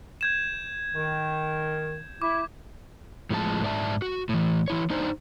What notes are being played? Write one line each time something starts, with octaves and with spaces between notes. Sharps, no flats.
G6 G#6 E7
D#3
E4 D6
A2 F3 G#3 D4 A5
G#2 D5 E5 A5
F#4
A2 E3
E3 E4 C#5
D4 D#4 C5